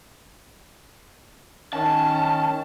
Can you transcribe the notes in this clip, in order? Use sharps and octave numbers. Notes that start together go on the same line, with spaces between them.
D#3 C#4 A5